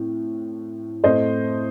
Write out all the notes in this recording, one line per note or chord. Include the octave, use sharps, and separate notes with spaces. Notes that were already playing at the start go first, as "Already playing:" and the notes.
Already playing: A2 C4
A2 A3 C4 C5 D#5